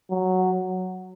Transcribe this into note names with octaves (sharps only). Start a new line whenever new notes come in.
F#3